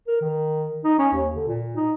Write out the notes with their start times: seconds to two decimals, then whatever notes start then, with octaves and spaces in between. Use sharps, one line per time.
0.07 A#4
0.21 D#3
0.84 D#4
0.99 C#4
1.13 D#2
1.35 D3
1.48 A#2
1.76 D#4